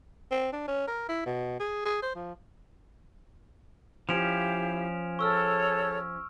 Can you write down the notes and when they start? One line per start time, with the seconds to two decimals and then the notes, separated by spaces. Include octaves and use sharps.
0.32 C4
0.53 D4
0.68 C#4
0.87 A#4
1.09 E4
1.26 B2
1.60 G#4
1.86 G#4
2.02 C5
2.16 F3
4.09 F3 C#4 E4 G4 F5 D7 E7 F7
5.19 G#4 A4 C#5 C#6 E6 F6